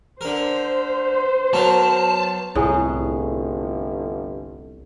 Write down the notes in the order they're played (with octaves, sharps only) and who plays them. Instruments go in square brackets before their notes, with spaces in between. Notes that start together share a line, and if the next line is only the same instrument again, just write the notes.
[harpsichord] D3 A#4 [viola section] C5
[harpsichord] F#3 B3 A#4 [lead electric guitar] A5
[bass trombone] G1 [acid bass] C2 [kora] A2 [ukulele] G#4 G#5 A#5